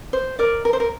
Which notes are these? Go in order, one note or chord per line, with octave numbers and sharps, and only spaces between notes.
C5
A#4 D5
A#4
C5
A#4